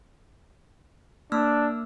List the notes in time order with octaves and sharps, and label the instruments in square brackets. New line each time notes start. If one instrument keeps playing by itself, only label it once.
[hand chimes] A#3 E6 F6 [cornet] D4